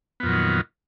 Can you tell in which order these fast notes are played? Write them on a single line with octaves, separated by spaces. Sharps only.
B3 F2 A#2 F#3 D#3